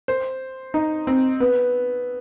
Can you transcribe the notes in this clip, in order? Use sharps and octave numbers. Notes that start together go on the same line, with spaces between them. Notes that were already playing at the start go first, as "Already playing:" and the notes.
C5
D#4
C4
B3